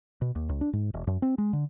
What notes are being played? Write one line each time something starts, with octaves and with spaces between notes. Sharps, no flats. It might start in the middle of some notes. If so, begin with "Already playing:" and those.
B2
D#2
C#2
D4
G#2
E1
F#2
C4
G#3
D3